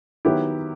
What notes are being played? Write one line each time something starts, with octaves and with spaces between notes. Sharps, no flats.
D#3 F#3 B3 E4 G4